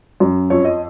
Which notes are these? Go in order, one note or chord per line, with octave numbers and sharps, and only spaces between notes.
F#2
F2 C#5
D#5